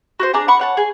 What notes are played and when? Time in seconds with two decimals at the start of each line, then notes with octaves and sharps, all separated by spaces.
0.20 F#4 G4 C5
0.34 D4 G#4 G#5 A#5
0.48 F#5 B5 C#6
0.59 C#5 F#5 A5
0.77 G#4 G#5